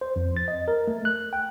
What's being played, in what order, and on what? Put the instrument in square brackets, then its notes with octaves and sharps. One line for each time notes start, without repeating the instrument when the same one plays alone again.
[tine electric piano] C5
F2
A6
D#5
A#4
A3
F#6
G5